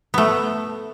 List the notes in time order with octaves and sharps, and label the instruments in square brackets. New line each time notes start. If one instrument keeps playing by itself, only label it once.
[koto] A3 B3